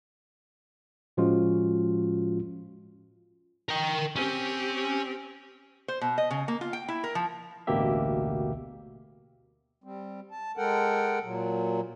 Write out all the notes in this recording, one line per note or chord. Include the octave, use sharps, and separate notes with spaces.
A2 F3 G#3 C#4 F4 F#4
A#4 G5
C4 C#4 G4
C5
B2
D#5
C#3
A#3
F4
G5
E4
A#4
F3
A1 D2 B2 A#3 G4 E5
G3 C4
A5
G#3 A4 A#4 F#5 G5
A#2 F#3